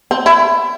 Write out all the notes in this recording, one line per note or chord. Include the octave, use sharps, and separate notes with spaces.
C4
E4